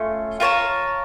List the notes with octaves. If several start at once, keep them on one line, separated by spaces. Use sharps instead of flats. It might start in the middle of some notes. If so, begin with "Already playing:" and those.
Already playing: A3 C#4 F4
F4 A#4 C#5 A5